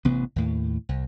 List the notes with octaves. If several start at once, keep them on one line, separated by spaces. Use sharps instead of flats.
A1 C3 B3
D#2 A2
C2